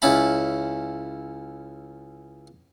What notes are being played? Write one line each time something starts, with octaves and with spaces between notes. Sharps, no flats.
C#2 C#4 E4 A5 B5